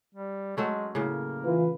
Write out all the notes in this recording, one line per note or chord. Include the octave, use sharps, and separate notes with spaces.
G3
F#3 G#3 A3 C#4
A2 C#3 A#3
E3 F4 B4